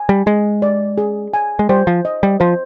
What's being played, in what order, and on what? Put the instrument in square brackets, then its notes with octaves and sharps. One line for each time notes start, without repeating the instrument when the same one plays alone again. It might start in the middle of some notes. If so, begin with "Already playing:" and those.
Already playing: [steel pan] G#5
[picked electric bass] G3
[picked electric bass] G#3 [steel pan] G#4
[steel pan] D5
G#4
G#5
[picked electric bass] G#3
[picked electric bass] G3 [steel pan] C5
[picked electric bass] F3
[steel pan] D#5
[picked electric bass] G3
[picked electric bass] F3 [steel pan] C5